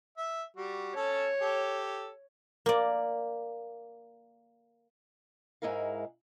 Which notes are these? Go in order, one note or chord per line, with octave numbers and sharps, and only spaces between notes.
E5
G3 F#4
C#4 A4 C#5 A5
G4 A4
A#3 D5
G#2 E3 G#3 E4 A#4 F5